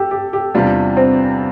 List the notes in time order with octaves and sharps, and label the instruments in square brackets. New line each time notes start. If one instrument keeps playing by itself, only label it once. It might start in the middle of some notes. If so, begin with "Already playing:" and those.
Already playing: [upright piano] G4 A4
G4
G4
[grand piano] E2 C3 G3 D4 F4
[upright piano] C4